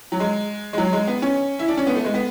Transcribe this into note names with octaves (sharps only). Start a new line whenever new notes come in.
F#3
G#3
G#3
F#3
G#3
B3
C#4
E4
D4
C#4
B3
A3
G#3
B3